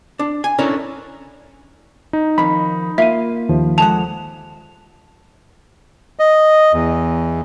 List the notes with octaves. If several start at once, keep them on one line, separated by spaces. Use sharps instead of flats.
D4
G#5
C#4 D4 E4 A4 A#4 C#5
D#4
F2 D#3 B5
A#3 F4 E5 F5 D#7
D#2 F3
D3 G#3 F#5 A5 F7
D#5
E2